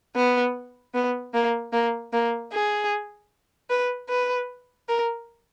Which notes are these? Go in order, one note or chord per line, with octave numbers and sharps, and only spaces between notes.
B3
B3
A#3
A#3
A#3
G#4
B4
B4
A#4